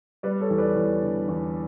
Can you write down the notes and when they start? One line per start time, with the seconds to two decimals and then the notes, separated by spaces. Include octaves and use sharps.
0.23 G3 B4 D5
0.40 A4 C#5
0.50 E2
0.58 B4 D5
0.76 E2
1.02 D3
1.28 E2